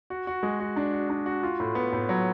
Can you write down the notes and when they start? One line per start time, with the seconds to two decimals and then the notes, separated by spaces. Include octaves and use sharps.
0.10 F#4
0.27 F#4
0.43 G#3
0.60 F#4
0.76 D4
0.92 F#4
1.09 D4
1.26 F#4
1.43 F4
1.60 A2
1.75 B3
1.93 A2
2.09 F#3